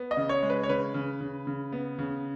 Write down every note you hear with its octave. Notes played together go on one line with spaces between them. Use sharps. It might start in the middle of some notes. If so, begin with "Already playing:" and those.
Already playing: B3
D#5
C#3
C#5
G#3
B4
C#5
C#3 B4
C#3
C#3
C#3
B3
C#3